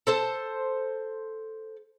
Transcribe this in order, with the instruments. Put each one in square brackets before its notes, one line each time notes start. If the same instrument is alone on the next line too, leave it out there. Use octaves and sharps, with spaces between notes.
[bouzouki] A4 C5 A5